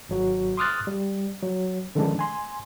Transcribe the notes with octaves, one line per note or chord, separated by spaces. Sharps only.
G#1 F#3 F#4
C6 D6 D#6 F6 F#6 A6
G3
F#3
D3 D#3 F3 G#3 C#4 D4
G#5 C6